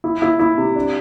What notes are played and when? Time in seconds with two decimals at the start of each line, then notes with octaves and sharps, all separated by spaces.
0.04 E4
0.22 E4
0.39 E4
0.58 C3
0.76 D4